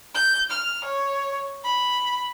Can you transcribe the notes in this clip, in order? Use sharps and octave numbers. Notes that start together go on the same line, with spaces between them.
G6
F6
C#5
B5